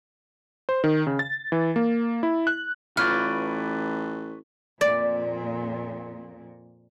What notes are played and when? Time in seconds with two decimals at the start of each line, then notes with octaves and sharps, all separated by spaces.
0.69 C5
0.84 D#3
1.07 C#3
1.19 A6
1.52 E3
1.76 A#3
2.23 E4
2.47 F#6
2.97 A1 F4 B4 C#5 D5 F6
4.81 F2 A#2 D5